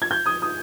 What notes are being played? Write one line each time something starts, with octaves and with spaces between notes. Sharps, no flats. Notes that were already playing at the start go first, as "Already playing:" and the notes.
G#6
G6
D#6
D#6